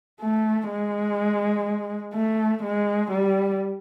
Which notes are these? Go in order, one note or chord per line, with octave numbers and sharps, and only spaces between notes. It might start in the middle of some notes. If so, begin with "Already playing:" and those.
A3
G#3
A3
G#3
G3